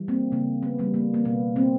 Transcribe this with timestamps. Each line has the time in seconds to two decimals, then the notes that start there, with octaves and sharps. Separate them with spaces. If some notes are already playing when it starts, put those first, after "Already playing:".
Already playing: E3 G3
0.08 A#3 C4
0.32 C#3 A#3
0.63 B3
0.78 E3 G3 A#3
0.94 A#3
1.14 A#3
1.25 B2 B3
1.56 A#3 C4